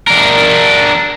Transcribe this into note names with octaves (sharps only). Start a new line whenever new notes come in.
D4 A#4